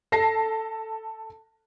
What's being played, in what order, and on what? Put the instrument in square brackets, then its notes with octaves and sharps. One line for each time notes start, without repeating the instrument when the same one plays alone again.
[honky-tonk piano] A4 A5 A#6 C7